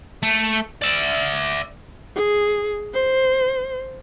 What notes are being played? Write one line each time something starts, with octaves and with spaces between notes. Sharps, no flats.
A3
D5 E5
G#4
C5